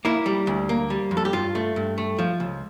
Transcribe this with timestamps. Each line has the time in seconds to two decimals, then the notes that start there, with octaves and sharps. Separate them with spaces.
0.05 A#3 E4
0.26 G3
0.47 D2
0.69 A#3
0.90 G3
1.11 F2
1.17 A4
1.25 G4
1.33 G2 F4
1.55 A3
1.76 G2
1.98 A3
2.19 F3
2.40 C#2